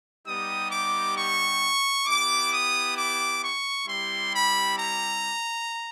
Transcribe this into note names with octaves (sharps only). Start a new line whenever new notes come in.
G3 B3 D#4 G4 D#6
D6
C#6
B3 E4 G4 D6
D#6
D6
C#6
G3 C4 E4 G4 C6
B5
A#5